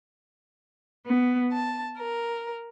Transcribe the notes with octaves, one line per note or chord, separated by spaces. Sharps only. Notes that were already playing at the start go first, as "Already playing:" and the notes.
B3
A5
A#4